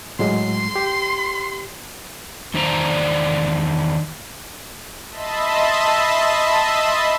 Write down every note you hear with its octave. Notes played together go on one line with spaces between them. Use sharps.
A2 F#3 G#3 C6
G4
E2 D#3 D4 C5 D5 A#5
D#5 E5 A5 B5 C6